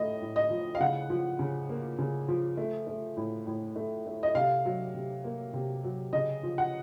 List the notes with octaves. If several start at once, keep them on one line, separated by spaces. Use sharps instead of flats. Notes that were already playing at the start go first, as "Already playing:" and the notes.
Already playing: A2 A3 D#5
A2
D#5
F3
F5
C#3 F#5
F3
C#3
A#3
C#3
F3
A3
A3
A2
A2
A3
A3
D#5
C3 F5
F#3
C3
A#3
C3
F#3
C#3 D#5
F3
F#5